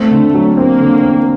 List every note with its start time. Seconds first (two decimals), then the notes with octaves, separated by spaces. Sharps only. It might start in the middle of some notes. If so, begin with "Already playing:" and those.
Already playing: A3 C4
0.11 D3
0.34 F#3
0.57 A#3 C4
0.80 D3
1.03 C4